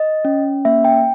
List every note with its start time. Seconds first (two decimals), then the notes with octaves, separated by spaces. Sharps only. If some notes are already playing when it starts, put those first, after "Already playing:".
Already playing: D#5
0.25 C#4
0.65 A#3 E5
0.85 G5